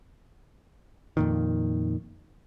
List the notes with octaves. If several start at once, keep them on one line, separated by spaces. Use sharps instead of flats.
F2 A#2 D#3